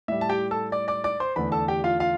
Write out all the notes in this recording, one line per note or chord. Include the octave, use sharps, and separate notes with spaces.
A2 G3 E5
A5
G4 G5
A4 A5
D5 D6
D5 D6
D5 D6
C5 C6
E2 D3 A3 B4 B5
A4 A5
G4 G5
F4 F5
F4 F5